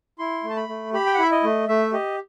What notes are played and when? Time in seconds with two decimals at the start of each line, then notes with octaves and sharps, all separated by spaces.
0.19 E4 C6
0.44 A3
0.50 A5
0.56 B5
0.69 A3
0.93 G4 B5
1.06 G5
1.14 F#5
1.18 E4 E5
1.31 D#5
1.43 A3
1.68 A3 E5
1.92 G4 D#5